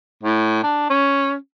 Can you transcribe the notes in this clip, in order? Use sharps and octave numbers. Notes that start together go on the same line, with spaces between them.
A2
D4
C#4